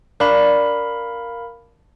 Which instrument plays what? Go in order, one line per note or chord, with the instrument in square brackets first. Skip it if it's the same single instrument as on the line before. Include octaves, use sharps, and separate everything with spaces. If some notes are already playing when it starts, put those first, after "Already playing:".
[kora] D4 [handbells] A#4 F5 B5